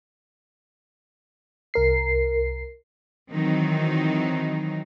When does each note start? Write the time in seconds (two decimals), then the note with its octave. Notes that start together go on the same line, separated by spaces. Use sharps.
1.74 C2 A#4 C7
3.32 D#3 E3 F#3 C4 D#4